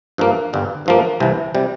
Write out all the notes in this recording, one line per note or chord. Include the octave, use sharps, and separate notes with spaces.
G2 F3 A#3
G1 G2 D3
G2 F3 A#3
C2 C3 E3
C3 G3